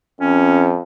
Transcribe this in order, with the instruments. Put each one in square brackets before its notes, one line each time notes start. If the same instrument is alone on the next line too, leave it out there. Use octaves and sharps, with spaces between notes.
[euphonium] F2 [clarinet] C#4